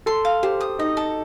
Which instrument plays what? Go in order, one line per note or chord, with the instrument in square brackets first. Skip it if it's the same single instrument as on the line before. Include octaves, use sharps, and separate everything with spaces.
[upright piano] A4 [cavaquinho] C6
[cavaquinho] F5
[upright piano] G4 [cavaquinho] C5
[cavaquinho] D#6
[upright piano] D#4 [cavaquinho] D#5
[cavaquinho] A4